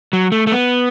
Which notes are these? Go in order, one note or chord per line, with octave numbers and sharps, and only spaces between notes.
F#3
A3
A3
B3